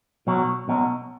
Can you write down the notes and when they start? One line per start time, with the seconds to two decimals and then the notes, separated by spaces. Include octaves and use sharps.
0.27 B1 B2 F#3
0.68 B1 B2 F#3